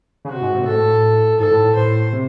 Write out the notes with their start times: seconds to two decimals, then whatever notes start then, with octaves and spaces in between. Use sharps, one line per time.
0.25 C#3
0.29 C3 F#4
0.42 G#2
0.54 C3
0.62 A2
0.67 G#2 A4
0.76 A2
1.40 G#2 A4
1.51 A2
1.64 A2
1.76 A2 C5
2.13 C3